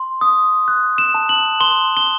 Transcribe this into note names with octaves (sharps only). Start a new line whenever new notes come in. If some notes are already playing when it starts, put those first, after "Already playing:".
Already playing: C6
D#6
F#6
E7
A5
F#7
C6 G7
G7